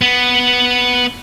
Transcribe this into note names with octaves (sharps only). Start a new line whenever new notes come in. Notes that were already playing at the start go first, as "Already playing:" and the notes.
B3